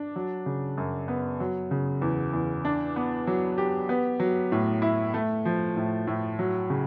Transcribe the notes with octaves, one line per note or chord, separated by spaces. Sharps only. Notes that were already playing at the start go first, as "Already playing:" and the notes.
Already playing: D4
F#3
C#3
F#2
B3
F#3
C#3
E2
E2
D4
B3
F#3
G4
B3
F#3
A2
E4
A3
F3
A2
A2
F#3
C#3